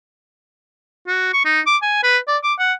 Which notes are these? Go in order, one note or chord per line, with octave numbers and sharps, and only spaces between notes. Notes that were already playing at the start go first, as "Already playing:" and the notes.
F#4
C#6
D#4
D6
G#5
B4
D5
D6
F#5